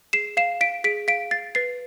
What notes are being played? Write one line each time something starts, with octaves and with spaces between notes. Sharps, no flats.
G#4 C7 E7
F5 C7 E7
F5 B6 D7
G#4 B6 D7
F5 B6 D7
F5 A6 C7
B4 A6 C7